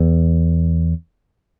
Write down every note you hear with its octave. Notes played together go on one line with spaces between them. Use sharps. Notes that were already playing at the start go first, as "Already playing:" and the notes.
Already playing: E2